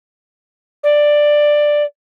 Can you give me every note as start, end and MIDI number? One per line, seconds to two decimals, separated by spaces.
0.83 1.83 74